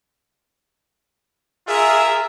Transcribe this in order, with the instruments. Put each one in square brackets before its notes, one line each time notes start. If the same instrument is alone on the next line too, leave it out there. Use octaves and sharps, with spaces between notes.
[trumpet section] F4 A#4 E5 [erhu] G#4